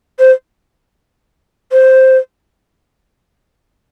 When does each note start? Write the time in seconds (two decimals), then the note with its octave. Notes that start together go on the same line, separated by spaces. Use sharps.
0.19 C5
1.72 C5